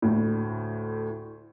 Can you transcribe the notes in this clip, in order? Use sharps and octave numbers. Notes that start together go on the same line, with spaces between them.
D2 A2